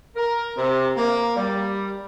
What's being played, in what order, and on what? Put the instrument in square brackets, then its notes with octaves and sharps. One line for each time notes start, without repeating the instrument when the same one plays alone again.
[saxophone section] A#4
C3
A#3
G3